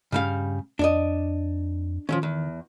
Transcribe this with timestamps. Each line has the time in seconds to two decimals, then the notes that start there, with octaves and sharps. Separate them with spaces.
0.12 G2 C#3 G3 F5
0.79 F2 D4 D5 D#5
2.09 D#3 F3 F#3 C#4
2.23 E2